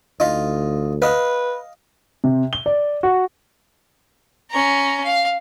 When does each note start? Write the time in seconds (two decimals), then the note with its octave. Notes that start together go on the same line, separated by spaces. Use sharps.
0.20 D2 D#4 F4 D#5
1.02 B4 D#5 F5
2.24 C3
2.53 G7
2.66 D5
3.03 F#4
4.51 C#4 A#5
5.04 F5